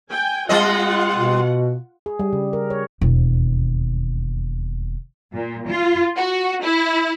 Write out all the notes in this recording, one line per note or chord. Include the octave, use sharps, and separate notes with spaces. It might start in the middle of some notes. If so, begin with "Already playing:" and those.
G5 G#5
G3 C4 F4 D#5 F#5
B2
G#4
G3
C#3
A#4
C#5
E1 D#2
A#2
F4
F#4
E4